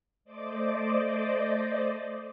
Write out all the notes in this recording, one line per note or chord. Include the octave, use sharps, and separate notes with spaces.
A3 C5 D5 D#5 D6